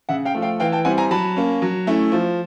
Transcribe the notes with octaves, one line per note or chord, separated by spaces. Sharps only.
C#3 E5 F#5
F5 G5
F3 A3
F5 G5
E3 F5 G5
G5 A5
G3 C4 E4 F#5 G#5
G#5 A#5
F#3 A5 B5
A#3 C#4
F#3
A3 C#4 E4
F3